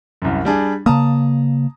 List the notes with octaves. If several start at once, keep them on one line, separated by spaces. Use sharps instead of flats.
C2 F#2
G3 D4 G#4
C#3 A#3 A5 A#5 D#6